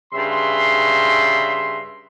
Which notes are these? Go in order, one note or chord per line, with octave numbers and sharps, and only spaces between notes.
G2 C#3 E5 C6